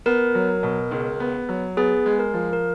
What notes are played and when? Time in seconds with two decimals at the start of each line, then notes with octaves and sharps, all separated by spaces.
0.06 B3 A#4
0.35 F#3
0.63 B2
0.91 C#2
1.20 B3
1.49 F#3
1.77 B3 G#4
2.06 G#3
2.19 A#4
2.34 F3
2.53 A#4